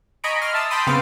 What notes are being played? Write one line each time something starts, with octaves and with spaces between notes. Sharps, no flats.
D#5 G#5 A#5 B5 C#6 D7
C6 D6 F6
E5 A5 D#6 E6
G5 A5 B5 C6 D#6
C#3 B3 C4 F5 D7